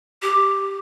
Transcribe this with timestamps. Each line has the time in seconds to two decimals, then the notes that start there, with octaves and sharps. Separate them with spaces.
0.22 G4